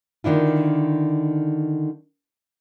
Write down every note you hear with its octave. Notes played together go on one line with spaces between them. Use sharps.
D3 D#3 D4 E4 F4